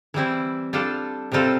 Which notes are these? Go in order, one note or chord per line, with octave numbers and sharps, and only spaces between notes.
E3 G3 C4 E4
G3 D4 F4 A4
C3 G3 C4 F4 A4